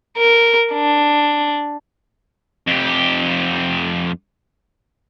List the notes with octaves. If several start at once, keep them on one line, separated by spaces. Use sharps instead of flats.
A#4
D4
F2 G4